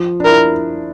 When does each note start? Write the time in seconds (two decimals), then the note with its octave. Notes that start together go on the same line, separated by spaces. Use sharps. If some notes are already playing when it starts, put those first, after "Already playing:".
Already playing: F3
0.20 D4
0.25 E4 A#4